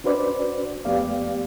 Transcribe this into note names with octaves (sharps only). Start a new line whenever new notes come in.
C#4 D4 F#4 B4 C5 D5
F2 A3 B3 G4 D5 F5